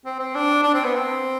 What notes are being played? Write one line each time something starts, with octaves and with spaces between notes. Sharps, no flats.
C4
C4
D4
D4
C4
B3
C4